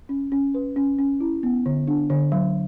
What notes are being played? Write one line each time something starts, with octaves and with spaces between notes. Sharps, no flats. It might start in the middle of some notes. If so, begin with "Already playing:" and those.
C#4
C#4
B4
C#4
C#4
E4
B3
D3
D4
D3
F#3